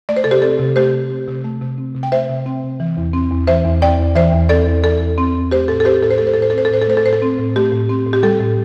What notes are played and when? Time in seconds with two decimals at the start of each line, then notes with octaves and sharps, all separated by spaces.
0.09 A3 D5
0.17 C5
0.24 C3 A4
0.31 G4 C5
0.42 C4 A4
0.60 C3
0.76 A3 G4 C5
0.93 C3
1.11 C4
1.28 C3
1.44 A3
1.62 C3
1.78 C4
1.95 C3
2.03 G5
2.12 A3 C5 E5
2.29 C3
2.46 C4
2.63 C3
2.80 E3
2.97 E2
3.13 C4
3.31 E2
3.47 E3 C5 E5
3.65 E2
3.81 C4 D5 G5
3.98 E2
4.15 E3 C5 E5
4.32 E2
4.49 C4 A4 D5
4.67 E2
4.84 E3 A4
5.01 E2
5.18 C4
5.35 E2
5.51 A3 G4 C5
5.68 A2 A4
5.80 A4
5.85 C4 G4 C5
6.03 A2 A4
6.11 C5
6.18 A3 A4
6.27 C5
6.34 A2 A4
6.42 C5
6.50 A4
6.53 C4 C5
6.65 A4
6.71 A2 C5
6.81 A4
6.87 A3 C5
6.97 A4
7.05 A2 C5
7.13 A4
7.22 C4
7.38 A2
7.56 A3 G4
7.72 A2
7.89 C4
8.07 A2
8.13 G4
8.23 G3 A4
8.40 A2